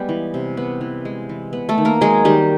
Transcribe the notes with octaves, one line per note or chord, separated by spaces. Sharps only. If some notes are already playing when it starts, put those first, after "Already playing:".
Already playing: G3 G#3 B3 G4
E3
C3
B3
E3
G#3
E3
B3
A3 A4
D#3
A#3 A#4
F#3 G#3 G#4
D#3 G3 G4